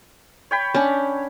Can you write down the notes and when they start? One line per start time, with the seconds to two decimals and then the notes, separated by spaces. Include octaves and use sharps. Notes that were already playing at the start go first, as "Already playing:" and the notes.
0.51 C#5 G5 B5
0.75 C#4 D4